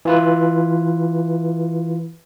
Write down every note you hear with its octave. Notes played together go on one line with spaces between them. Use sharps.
E3 F4 B4